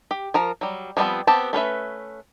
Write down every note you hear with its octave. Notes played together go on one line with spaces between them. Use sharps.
G4
F3 A#4 A#5
F#3 G3
F3 G3 A3 B3 C4
B3 C4 G4 A5
A3 C#4 B4 E5